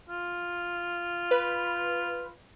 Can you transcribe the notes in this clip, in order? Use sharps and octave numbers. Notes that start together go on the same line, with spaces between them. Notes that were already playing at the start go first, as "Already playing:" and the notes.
F4
B4